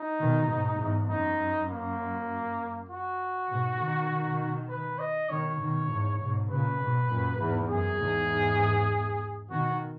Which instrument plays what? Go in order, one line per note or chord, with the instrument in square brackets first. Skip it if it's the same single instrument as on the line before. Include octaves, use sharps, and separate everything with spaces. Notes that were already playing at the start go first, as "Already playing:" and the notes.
Already playing: [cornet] D#4
[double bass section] B2 D#3
G#2 B2
E2 G#2
[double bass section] F#2 [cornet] D#4
[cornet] A#3
F#4
[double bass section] G#2 B2
B2 D#3
[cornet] B4
D#5
[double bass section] B2 D#3 [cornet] C#5
[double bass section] B2 D#3
E2 G#2
G#2 B2
[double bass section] A#2 C#3 [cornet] B4
[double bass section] G#2 B2
F#2 A#2
E2 G#2
[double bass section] F#2 [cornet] G#4
[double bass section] E2 G#2
[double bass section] B2 D#3 [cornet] F#4